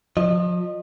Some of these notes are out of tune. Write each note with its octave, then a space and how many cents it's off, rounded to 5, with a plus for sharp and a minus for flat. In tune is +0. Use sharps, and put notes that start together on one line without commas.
F3 +35 D#5 -25